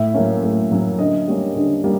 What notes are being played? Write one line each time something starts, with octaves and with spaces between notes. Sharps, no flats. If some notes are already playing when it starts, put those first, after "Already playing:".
Already playing: A2 E5
F#3 A#3 C#4
A2
F#3 A#3 C#4
D3 D#5
G3 A#3 C#4
D3
G3 A#3